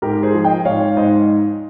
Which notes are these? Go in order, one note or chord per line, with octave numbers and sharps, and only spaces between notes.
G#2 G4 A#4
G#4 C5
F3
D#5 G5
G#2 C#5 F5
G#2 C5 D#5